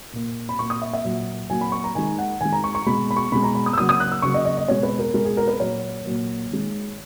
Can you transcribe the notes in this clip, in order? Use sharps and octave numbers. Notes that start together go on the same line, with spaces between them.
A#2 A#3
B5
A#2 A#3 C#6
D#6
E5
E5
A#2 F#3 A#3
A#2 F#3 A#3 G#5
B5
C#6
A#5
D#3 G#3 G#5
F#5
D#3 G#3 G#5
A#5
C#6
C#6
B2 G#3 B5
B5
C#6
B2 G#3 B5
A#5
B5
D#6
E6
C#3 F#3 A#3 D#6
D#6
F#6
E6
C#3 F#3 A#3 C#6
D#5
D#5
D#5
B2 G#3 C#5
B4
A#4
B2 G#3 A#4
G#4
A#4
B4
A#2 F#3 A#3 C#5
A#2 F#3 A#3
D#3 G#3